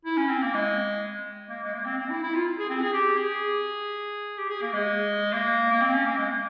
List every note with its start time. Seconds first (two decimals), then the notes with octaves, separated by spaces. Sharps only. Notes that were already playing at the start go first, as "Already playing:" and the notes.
0.05 E4
0.17 C#4
0.29 C4
0.42 A#3
0.54 G#3
1.50 A#3
1.64 G#3
1.74 A#3
1.85 C4
1.98 C4
2.10 E4
2.23 E4
2.35 F4
2.59 G#4
2.70 C4
2.81 G#4
2.93 G4
3.18 G#4
4.38 G4
4.49 G#4
4.61 A#3
4.73 G#3
5.33 A#3
5.72 A#3
5.81 C4
5.94 C#4
6.06 A#3
6.18 G#3
6.30 A#3